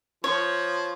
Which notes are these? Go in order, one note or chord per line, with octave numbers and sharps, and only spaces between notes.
F3 C#5